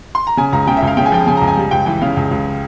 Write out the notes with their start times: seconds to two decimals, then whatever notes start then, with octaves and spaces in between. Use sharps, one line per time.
0.15 C6
0.27 A#5
0.37 C#3 G#5
0.52 C#2 A#5
0.67 C#3 G5
0.77 E5
0.82 C#2
0.87 F5
0.97 C#3 G5
1.06 G#5
1.12 F3 G5
1.27 C#3 G#5
1.37 A#5
1.41 C#2
1.47 G#5
1.57 G3
1.71 C#2 G5
1.86 E3 G5
2.01 C#3 F5
2.17 C#2
2.31 C#2